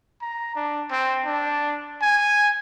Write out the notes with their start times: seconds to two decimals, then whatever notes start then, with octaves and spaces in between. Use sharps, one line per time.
0.22 A#5
0.56 D4
0.91 C4
1.26 D4
2.02 G#5